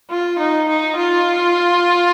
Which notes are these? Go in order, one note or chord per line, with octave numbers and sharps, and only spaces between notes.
F4
D#4
D#4
F4